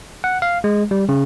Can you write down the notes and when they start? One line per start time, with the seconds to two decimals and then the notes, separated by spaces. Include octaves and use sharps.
0.24 F#5
0.42 F5
0.64 G#3
0.91 G3
1.09 C#3